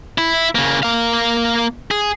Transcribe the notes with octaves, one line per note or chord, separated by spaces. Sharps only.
E4
C#3 A#3
A#3 F5
G#4